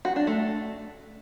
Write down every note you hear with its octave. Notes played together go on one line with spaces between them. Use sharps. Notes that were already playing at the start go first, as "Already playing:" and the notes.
F#4
D4
A3